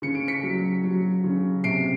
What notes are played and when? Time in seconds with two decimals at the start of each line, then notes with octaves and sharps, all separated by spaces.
0.02 C#3 C#7
0.15 D7
0.28 B6 C#7
0.43 F#3
0.84 F#3
1.24 C#3
1.64 C3 C7 D7